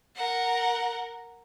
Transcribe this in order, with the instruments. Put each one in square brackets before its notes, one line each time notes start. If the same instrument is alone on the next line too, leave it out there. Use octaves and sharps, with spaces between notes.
[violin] A#4 F#5